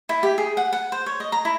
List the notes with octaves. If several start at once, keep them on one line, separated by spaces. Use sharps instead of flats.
E4
G4
G#4
F#5
F#5
C5
C#5
D#5
A#5
E4